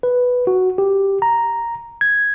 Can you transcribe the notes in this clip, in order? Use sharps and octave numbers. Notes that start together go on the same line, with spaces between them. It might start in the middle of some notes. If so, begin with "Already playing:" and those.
B4
F#4
G4
A#5
G#6